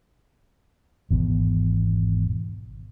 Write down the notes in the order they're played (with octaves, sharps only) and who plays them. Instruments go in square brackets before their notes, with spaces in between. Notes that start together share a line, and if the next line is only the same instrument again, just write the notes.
[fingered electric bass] G#1 E2 B2